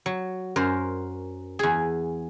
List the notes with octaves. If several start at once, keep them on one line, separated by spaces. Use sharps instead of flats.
F#3
F#2 A#4 C5
E2 G#4